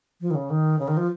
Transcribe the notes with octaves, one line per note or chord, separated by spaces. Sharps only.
F3
D#3
C#3
D#3
C#3
D#3
F3